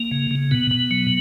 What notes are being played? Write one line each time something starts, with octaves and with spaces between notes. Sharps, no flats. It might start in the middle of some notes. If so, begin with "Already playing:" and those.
Already playing: A#3
C#3
C#3
B2 B3
B2
F#3